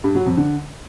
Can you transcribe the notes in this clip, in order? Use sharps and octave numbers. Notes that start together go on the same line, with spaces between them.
G2
F#3
F2
D3